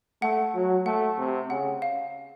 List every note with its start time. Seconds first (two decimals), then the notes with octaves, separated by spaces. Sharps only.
0.22 A3 F#5
0.54 F#3
0.86 A3 F#5
1.18 C3
1.50 C#3 F#5
1.82 F5